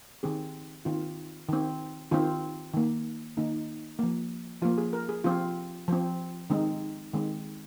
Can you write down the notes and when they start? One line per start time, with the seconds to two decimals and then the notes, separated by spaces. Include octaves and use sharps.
0.23 D#3 C4 G#4
0.85 D#3 C4 F4
1.49 D#3 C4
2.11 D#3 C4 F4
2.73 D#3 A#3
3.37 D#3 A#3 D#4
3.99 F3 A#3
4.62 F3 F4
4.65 A#3
4.78 G#4
4.93 A#4
5.09 G#4
5.24 F3 C4 F4
5.88 F3 C4
6.50 D#3 G#3 C4 D#4
7.14 D#3 G#3 C4